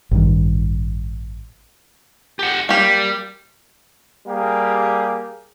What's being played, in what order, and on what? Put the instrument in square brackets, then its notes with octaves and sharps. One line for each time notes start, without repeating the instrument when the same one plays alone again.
[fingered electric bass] A1 G2 D#3
[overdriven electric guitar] G4 F#5
[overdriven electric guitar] G3 [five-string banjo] A#3 G4
[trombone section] G3 A#3 G4 G#4